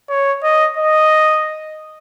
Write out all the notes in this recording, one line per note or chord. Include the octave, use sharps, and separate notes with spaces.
C#5
D#5
D#5